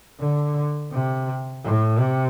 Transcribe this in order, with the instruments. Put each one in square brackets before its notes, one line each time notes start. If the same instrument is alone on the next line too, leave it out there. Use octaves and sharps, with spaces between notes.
[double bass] D3
C3
A2
C3